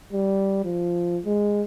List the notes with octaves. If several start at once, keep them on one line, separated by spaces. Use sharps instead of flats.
G3
F3
G#3